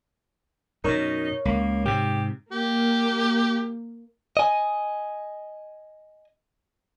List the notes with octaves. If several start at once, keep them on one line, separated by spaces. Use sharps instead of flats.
F#2 B2 D#4 A#4 C#5
C#2 A#3
G#2 C3 G4
A#3 G4
D#5 G#5